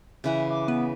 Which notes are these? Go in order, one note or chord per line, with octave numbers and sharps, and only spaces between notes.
C#3 E3 E5 F#5
D6
B3 B4